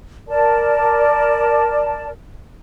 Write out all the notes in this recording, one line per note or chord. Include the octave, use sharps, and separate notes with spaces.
A#4 D5 A5